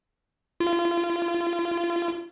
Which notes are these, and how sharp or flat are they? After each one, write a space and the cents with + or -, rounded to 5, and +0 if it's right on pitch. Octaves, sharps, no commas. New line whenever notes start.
F4 -30